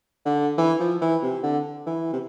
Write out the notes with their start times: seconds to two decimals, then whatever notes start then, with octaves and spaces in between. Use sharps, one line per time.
0.25 D3
0.58 E3
0.80 F3
1.01 E3
1.23 C3
1.43 D3
1.86 E3
2.13 C3